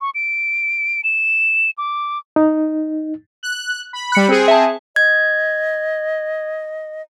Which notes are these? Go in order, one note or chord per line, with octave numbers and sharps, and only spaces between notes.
C#6
D7
E7
D6
D#4
F#6
B5
G3 B5 F#6 C#7
C4 G#4
E5 A5
D#5 G#6